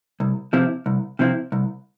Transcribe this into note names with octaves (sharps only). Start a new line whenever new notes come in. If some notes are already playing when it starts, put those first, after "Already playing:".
C2
C3 F3 C4 E4
C2
C3 F3 C4 E4
C2